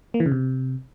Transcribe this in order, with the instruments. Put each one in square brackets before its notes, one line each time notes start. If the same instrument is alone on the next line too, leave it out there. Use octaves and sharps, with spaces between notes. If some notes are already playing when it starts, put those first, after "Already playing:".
[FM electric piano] A#3
E3
C#3
C3